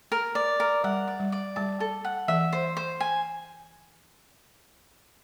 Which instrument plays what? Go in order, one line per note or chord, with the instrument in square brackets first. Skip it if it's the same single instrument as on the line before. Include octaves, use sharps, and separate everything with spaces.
[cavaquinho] A#4
D5
A#4
[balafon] G3 [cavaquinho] F#5
[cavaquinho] D5
[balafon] G3
[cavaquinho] D5
[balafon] G3 [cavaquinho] A5
[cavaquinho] A4
F#5
[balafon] E3 [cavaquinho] E5
[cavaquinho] C5
C5
G#5